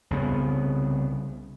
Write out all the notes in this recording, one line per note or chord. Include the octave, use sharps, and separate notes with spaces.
C2 C#3 B3